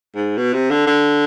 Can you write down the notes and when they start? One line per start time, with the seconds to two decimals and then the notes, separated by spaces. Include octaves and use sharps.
0.15 G#2
0.37 B2
0.53 C3
0.70 D3
0.87 D3